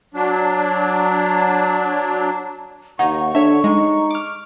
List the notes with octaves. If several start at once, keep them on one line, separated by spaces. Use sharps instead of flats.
F#3 D4
D#2 D#4 F#5 C#6
D3 D4 C#5 E5
G#3 D#4
D6 F6